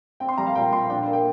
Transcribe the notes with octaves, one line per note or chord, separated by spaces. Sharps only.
C4 G5
C6
G3 A#5
F5
A#2 G5
A#2 C6
D4 G5
F5
A#3
G5